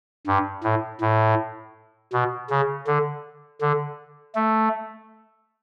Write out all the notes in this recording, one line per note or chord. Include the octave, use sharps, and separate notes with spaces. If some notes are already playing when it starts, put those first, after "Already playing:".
G2
A2
A2
B2
C#3
D3
D3
A3